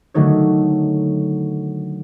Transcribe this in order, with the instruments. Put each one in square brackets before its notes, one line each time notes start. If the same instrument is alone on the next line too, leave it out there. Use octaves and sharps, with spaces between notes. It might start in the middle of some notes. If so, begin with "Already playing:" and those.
[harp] D3 D#3 F#3 A3 D#4 C#5